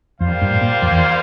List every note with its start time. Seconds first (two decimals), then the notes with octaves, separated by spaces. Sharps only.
0.20 F2 G3 A#3 F4 C5 F5
0.41 G2
0.51 A2
0.61 A#2
0.82 F2
0.91 E2